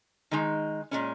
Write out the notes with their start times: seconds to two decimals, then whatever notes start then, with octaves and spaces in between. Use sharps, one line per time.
0.31 D#3 G#3 D#4
0.91 A#2 G#3 C#4